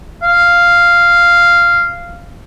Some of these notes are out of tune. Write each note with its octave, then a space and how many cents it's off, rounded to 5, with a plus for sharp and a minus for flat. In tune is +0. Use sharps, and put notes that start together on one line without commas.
F5 -5